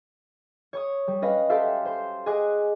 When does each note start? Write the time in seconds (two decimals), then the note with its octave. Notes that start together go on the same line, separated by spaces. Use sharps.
0.73 C#5 C#6 D#6
1.08 G3
1.22 C#4 B4 D#5 F5 A#6
1.49 G4 A4 E5 F5 C6
1.85 C5 C6
2.26 G#4 D#5 G#5 D6 F#6